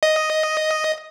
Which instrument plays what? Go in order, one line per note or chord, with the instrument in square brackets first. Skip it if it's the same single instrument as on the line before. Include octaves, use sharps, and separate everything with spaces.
[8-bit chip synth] D#5